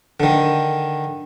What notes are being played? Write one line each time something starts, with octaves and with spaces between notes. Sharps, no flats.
D3 D#3